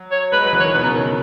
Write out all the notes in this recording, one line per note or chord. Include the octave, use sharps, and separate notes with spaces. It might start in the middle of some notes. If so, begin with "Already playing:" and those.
Already playing: F#3
C#5
G#3 B4
F#3
B4
E3
C#5
D#3
B2 B4
C#3 A#4
D#3
D#3